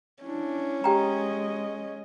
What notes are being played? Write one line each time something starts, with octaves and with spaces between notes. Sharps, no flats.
C#4 D4 E4
G#3 G4 D#5 G5 A#5